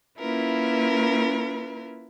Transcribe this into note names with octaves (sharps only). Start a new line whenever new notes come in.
A#3 C#4 E4 F4 A#4 B4